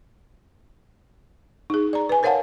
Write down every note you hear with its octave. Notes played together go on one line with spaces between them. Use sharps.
D#4 G#4
D5 A#5
B4 G#5
A#4 C5 C#5 F5 F#5 A5